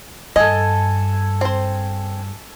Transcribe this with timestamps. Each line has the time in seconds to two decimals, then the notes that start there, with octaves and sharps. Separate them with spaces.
0.36 G2 A4 D#5 G#5
1.41 C4 C5